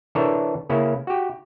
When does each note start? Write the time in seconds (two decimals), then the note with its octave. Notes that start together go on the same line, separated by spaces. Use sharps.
0.15 E3 D4 A4 A#4 C#5 A#5
0.69 C#3 A#3 C#4 E4
1.07 F#4 G4